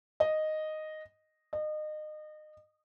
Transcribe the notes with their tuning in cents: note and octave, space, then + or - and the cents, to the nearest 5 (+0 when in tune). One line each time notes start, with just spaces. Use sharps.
D#5 -5
D#5 -30